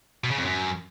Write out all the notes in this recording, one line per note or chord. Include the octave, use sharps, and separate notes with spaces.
B2
C#3
F2
F#2